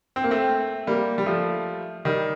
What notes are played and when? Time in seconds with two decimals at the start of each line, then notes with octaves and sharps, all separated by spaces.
0.16 C4
0.24 A#3
0.31 A3 C4
0.87 G3 A#3
1.18 G3
1.26 F3 A3
2.05 D#3 G3